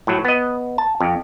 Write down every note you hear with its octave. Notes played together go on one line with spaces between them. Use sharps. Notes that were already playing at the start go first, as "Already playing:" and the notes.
A2 F#3
B3 D#5
A5
F2